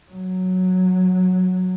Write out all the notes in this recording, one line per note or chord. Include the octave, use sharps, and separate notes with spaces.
F#3